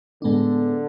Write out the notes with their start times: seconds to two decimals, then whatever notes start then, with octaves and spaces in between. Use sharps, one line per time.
0.22 A2 D3 G#3 B3 D4